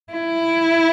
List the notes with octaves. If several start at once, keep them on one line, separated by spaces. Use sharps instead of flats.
E4